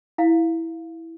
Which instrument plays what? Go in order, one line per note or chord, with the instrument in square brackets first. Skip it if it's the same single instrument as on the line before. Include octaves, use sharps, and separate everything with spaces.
[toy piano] E4 F5